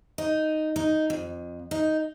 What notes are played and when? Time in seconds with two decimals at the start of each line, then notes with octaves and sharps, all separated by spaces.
0.18 D#4
0.76 D#4
1.10 F2
1.71 D#4